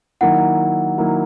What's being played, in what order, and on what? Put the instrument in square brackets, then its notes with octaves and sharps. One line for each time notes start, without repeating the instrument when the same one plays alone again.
[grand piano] D#3 F#3 A#3 E4 [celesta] F#5
[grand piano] D#3 F#3 A#3 E4